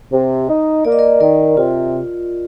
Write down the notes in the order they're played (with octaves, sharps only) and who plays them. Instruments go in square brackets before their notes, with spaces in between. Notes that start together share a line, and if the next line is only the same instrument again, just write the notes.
[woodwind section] C3
D#4
[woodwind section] A#3 [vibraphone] D5
[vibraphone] D#5
A#4 D5
[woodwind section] D#3 [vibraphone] A#4 D5
[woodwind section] C3 [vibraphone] F4